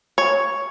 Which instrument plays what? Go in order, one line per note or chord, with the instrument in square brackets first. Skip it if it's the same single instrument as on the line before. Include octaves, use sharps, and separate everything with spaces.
[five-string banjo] C#5